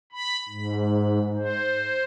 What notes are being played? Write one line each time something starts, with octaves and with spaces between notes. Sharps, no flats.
B5
G#2
C5